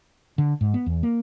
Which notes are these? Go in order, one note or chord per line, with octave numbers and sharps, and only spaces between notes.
D3
G#2
B3
E2
A#3